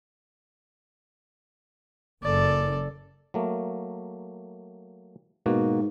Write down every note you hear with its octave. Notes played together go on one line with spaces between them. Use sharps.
F#1 A4 D5
F#3 A3 A#3
G#2 B2 A#3 F#4